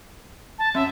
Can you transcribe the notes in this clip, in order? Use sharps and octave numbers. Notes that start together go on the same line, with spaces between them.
A5
F#2 E5